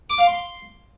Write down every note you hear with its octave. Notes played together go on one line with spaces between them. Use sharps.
D6
F5
C6